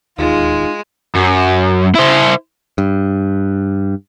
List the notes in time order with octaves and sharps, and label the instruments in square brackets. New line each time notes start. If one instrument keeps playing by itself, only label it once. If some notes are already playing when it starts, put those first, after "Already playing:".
[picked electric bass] D1 D#2 [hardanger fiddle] G#3 [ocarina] D#4 [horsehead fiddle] F4
[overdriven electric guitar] F#2
E4 C5
[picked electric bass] G2